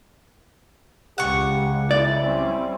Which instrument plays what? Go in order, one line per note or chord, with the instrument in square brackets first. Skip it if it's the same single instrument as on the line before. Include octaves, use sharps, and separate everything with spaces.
[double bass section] C#2 C#3 [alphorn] G4 [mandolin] F#5 C#6
[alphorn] E4 [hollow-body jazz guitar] D5
[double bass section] G3 C4 C#4